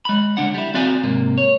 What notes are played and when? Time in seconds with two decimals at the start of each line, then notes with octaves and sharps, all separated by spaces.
0.05 G#3 B5
0.37 C#2 D4 F#5
0.54 G3 E4
0.74 C4 F#4 D5 F5 G#5
1.04 G#2 C3 A#3
1.38 C#5